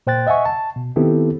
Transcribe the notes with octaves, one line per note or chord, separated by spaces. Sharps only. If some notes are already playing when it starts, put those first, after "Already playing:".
A#2 C5 G5 F#6 A6
D#5 E5 F#5 G#5 C#6
A5
B2
D#3 B3 C4 E4 G4 A4